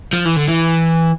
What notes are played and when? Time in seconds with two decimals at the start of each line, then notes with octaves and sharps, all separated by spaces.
0.13 F3
0.25 E3
0.36 D3
0.48 E3